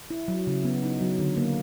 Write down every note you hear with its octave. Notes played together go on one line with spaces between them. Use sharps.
E4
F#3
C#3
B3
D#4
F#3
D3
A#3